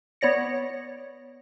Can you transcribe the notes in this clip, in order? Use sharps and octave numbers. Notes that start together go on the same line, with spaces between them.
B3 C#5 D5 A#6 C#7